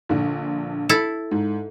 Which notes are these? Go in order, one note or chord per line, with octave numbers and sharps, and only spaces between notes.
A#1 D3
E4 A4
G#2